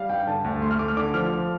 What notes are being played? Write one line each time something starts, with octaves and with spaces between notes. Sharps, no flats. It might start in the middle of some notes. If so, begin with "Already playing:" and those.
Already playing: G3 F5
G2 G5
G5
D3 A5
D2
A3 C6
F6
A3 D6
F6
D3 D6
F3 F6
F3